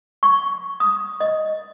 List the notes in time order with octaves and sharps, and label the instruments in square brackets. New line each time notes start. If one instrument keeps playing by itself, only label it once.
[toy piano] C#6
D#6
D#5